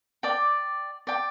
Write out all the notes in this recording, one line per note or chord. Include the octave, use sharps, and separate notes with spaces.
D5 G5 D6
D5 G5 D6